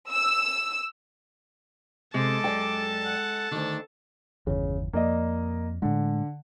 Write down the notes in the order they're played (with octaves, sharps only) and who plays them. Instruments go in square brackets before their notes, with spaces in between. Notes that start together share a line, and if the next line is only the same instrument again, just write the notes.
[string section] E6
[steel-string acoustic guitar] C3 [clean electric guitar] G#3 [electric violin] A4 A5 [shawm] D6
[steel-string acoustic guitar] F#2 D5 G5
[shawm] F#5
[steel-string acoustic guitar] D2 D#3 [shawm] D4
[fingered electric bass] G1 E2 [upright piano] C#3
[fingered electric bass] F2 [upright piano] A#3 D5 D#5
[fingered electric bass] A2 G#3 [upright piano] D3